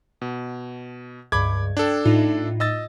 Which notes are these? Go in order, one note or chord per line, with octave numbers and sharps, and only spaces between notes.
B2
C#2 G2 B5 D6 G#6
D4 A4 G5
A2 D#4 F4
D#5 E6 A6